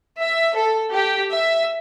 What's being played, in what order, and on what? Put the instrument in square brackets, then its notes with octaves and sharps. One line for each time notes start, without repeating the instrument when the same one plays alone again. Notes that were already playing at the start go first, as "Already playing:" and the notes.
[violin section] E5
A4
G4
E5